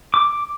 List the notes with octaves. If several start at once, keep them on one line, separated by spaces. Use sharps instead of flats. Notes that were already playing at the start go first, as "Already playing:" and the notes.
D6